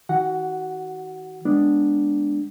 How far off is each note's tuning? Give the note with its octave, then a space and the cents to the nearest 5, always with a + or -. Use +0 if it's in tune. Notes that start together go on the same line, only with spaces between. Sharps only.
D#3 +45 F#4 +25 F#5 +0
G#3 +0 B3 +0 D4 +0